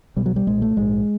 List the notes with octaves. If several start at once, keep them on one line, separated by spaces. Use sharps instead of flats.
B1 B2 G3
F#3
G3
B1 A#2 G#3
A3
A#1 G#2 G#3